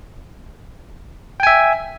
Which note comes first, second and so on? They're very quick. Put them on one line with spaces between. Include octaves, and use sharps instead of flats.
G5 G#5 E5